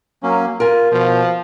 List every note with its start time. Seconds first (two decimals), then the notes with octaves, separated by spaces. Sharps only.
0.23 F#3 A#3 C#4
0.60 F4 A#4 G#5
0.92 B2 F3